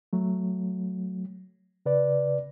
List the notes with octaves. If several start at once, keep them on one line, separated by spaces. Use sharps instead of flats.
F#3 A3
C#3 B4 D5